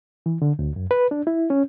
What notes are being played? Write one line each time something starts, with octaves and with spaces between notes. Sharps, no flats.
E3
D3
D2
F#2
B4
D4
E4
C#4